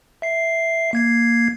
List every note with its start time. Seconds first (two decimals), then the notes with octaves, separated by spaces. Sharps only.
0.22 E5 C7
0.93 A#3 G#6 C7